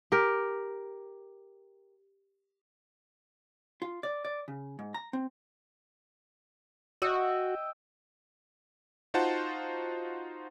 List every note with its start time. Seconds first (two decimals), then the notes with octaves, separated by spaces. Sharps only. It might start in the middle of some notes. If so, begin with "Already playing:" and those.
0.12 G4 A#4
3.82 F4
4.03 D5
4.25 D5
4.48 C#3
4.79 G#2
4.94 A#5
5.13 C4
7.02 F#4 D#5 E5 G5
9.14 D#4 F4 F#4 C5 F#5 A5